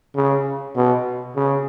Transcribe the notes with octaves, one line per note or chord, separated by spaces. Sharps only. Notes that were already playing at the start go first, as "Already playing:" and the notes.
C#3
B2
C#3